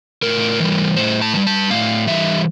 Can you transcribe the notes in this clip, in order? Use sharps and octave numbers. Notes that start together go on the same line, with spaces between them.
A2 A#4
E3 G3
A2 C5
A5
E3
G3
A5
A2 F5
E3 G3 E5